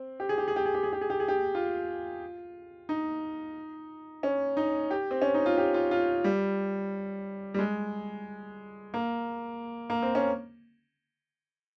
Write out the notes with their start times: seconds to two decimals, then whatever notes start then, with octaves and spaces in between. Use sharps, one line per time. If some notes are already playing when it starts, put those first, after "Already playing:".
Already playing: C4
0.20 G4
0.29 G#4
0.38 G4
0.48 G#4
0.56 G4
0.65 G#4
0.75 G4
0.83 G#4
0.93 G4
1.01 G#4
1.10 G4
1.20 G#4
1.28 G4
1.55 F4
2.89 D#4
4.23 C#4
4.57 D#4
4.91 G4
5.11 C4
5.22 C#4
5.34 D#4
5.46 F4
5.58 G4
5.74 F4
5.91 F4
6.24 G3
7.54 G3
7.59 G#3
8.94 A#3
9.90 A#3
10.02 C4
10.15 C#4